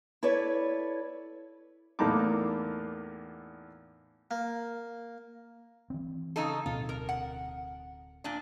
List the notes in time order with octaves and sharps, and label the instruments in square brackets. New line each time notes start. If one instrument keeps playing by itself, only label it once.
[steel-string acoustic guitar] E4 A4 B4 C#5 D5
[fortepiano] E2 A2 A#3 D#4 A5 D6
[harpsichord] A#3
[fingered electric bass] E3 C4
[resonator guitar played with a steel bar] C#3 D#4 A4
[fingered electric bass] D1 B2 C4 [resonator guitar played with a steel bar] F4
[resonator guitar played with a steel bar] A#4
F#5
A#2 D4